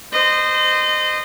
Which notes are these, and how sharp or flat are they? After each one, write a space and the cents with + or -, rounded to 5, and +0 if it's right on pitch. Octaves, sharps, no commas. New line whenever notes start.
C5 -20 D#5 -25